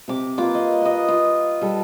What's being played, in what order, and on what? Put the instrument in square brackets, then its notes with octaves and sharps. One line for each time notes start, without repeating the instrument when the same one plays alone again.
[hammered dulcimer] C3 D6
A#3 F4 B4 D6
D#5
B4 D#5
F4
G3 A4